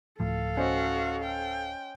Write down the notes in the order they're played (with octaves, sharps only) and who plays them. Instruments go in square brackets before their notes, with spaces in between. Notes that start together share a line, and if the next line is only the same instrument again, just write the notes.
[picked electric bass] D1 A2 F3 [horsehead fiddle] A4 F5
[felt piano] C#4 C5 D#5 [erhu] F#4
[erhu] G5